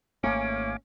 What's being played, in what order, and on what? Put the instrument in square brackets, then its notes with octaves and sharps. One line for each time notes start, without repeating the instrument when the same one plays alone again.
[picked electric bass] G#1 A3 A#3 [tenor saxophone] C#4 [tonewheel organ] F5 G#5 D6